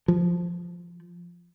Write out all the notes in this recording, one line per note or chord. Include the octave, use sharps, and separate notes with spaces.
F3